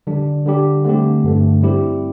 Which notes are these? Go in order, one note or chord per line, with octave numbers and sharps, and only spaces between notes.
D3 G3 D4
D3 G3 D4 G4
D3 A3 C4 G4
G2 D3 A3
G3 C4 E4 G4